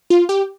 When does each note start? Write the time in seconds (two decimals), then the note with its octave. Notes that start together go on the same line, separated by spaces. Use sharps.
0.10 F4
0.29 G4